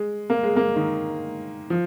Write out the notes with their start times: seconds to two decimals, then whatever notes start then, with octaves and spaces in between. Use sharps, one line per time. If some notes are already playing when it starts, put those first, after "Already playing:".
Already playing: G#3
0.30 A#3
0.43 G#3
0.56 A#3
0.76 D#3
1.70 F3